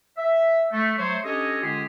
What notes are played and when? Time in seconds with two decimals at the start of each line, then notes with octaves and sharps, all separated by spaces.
0.18 E5
0.73 A3
0.98 F#3 A3 C5 C#5
1.25 C#4 D4 G4 A4 C#5 D#5
1.62 D3 G#3 C#4 F4 G4 G#4